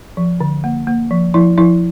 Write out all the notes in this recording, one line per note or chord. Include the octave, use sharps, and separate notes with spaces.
F3
D3
A#3
A#3
F3
F3 E4
F3 E4